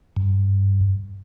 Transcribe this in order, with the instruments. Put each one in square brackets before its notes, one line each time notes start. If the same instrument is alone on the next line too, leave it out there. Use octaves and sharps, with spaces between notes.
[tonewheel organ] G2